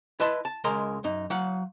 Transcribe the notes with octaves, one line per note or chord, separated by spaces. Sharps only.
E4 B4 D#5 A5 C6
A5
C#2 G#3 A#4 A#5 C6
F#2 D#4
F#3 F5 F#5